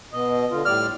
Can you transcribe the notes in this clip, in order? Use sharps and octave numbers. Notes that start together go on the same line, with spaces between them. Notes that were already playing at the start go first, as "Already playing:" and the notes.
B2 D#5
D3 F4
A2 G3 D5 F6